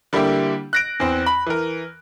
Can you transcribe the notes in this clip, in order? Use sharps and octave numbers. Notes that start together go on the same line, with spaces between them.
D3 G3 A#3 E4 G4
F#6 A#6 D7
E2 C4
B5
E3 A#4